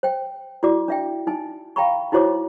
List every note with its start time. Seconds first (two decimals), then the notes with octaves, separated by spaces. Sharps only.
0.03 C5 G5
0.63 E4 F#4 D5 D6
0.88 D4 E5 G5
1.27 D#4 G#5
1.76 F5 G5 A#5 B5 C#6
2.12 D#4 E4 F#4 C5 C#5 D6